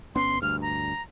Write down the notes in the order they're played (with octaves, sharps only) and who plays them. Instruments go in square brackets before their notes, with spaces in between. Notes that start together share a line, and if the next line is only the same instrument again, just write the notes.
[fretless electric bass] G1 B3 C#4 [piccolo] C6
[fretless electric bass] D2 G2 [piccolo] F6
[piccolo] A#5